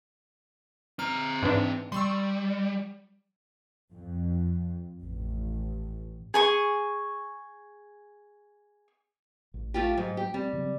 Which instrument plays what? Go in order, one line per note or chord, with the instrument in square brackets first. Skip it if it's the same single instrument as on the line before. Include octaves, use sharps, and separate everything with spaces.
[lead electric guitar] C4 A#5 [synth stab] F6
[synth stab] G#2 E3 D4
[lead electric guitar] G3 [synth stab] C6 C#6 E6
[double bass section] F2
A1
[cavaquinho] G#4 G#5 C#6
[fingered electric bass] A1
[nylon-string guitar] A3 F4 G4
[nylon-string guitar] G#2 [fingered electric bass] F#3
[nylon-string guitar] G4
[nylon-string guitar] G3 [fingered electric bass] C4
[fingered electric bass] C#3 F#3 C4